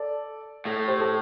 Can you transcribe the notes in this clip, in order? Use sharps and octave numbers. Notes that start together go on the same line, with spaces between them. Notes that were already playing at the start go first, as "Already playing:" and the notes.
Already playing: A4 D5
A2 A4
G4 C5
A4